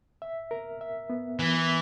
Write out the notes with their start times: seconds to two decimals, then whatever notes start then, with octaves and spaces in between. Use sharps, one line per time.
0.22 E5
0.51 A#4
0.81 E5
1.10 B3
1.39 E3 B3